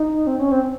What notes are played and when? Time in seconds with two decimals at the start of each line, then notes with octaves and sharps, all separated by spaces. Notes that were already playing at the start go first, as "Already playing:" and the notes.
Already playing: D#4
0.27 C4
0.39 C#4
0.52 C4